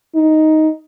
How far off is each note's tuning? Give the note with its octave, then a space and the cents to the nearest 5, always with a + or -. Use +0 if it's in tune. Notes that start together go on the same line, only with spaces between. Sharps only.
D#4 +5